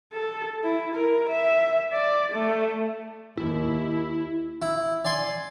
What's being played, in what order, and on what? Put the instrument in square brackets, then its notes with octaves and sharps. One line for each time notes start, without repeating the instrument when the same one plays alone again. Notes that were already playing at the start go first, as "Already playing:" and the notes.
[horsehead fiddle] A4
E4
A#4
E5
D5
A3
[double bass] D#2 [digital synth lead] E4
[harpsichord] E4
D5 G#5 C6